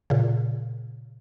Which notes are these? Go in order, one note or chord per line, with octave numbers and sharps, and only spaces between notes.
A#2 C#3